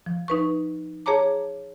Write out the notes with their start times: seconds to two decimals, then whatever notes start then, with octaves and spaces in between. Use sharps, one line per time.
0.06 F3
0.28 D#4 B4 C#6
1.06 G#4 C#5 A5 A#5 D6